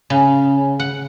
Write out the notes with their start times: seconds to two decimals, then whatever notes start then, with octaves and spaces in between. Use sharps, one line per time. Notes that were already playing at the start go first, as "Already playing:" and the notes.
0.10 C#3
0.80 F#5